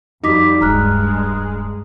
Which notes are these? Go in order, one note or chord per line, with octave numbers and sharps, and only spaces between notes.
F2 G3 D#4 F#4 D6 B6
D1 G2 G#3 A#5 F6 F#6